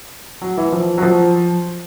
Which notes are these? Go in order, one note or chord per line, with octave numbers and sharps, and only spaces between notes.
F#3
E3
F3
F#3
F3